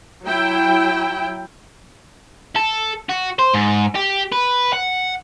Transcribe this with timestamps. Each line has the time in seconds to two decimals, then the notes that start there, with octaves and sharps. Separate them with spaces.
0.25 F#3 E4 G5
2.56 A4
3.10 F#4
3.39 C5
3.54 G#2
3.95 G4
4.33 B4
4.73 F#5